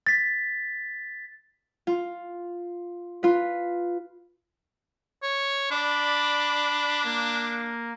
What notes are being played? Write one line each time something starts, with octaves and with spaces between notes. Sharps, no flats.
A6 B6
F4
F4 B4
C#5
D4 D5 B5
A#3